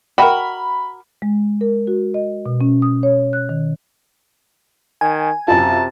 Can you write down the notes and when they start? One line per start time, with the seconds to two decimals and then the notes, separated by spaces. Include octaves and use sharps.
0.18 F#4 A#4 D#5 E5 G5 B5
1.22 G#3
1.61 A#4
1.87 F#4
2.14 D#5
2.46 B2
2.61 C#4
2.82 D#6
3.03 C#5
3.33 F#6
3.49 D#3
5.01 D#3 G#5
5.48 F#2 C3 F4 A5